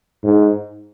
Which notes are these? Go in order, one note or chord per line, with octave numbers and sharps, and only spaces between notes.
G#2